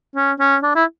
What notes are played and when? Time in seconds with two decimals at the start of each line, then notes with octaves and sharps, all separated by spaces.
0.16 C#4
0.40 C#4
0.63 D4
0.76 E4